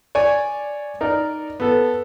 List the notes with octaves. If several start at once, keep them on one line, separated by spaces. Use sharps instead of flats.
C#5 D5 G#5
D#4 A#4 D5
B3 A4